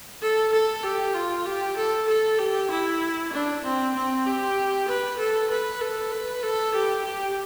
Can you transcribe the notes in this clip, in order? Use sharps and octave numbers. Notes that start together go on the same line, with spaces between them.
A4
A4
G4
F4
G4
A4
A4
G4
E4
D4
C4
C4
G4
B4
A4
B4
A4
B4
A4
G4
G4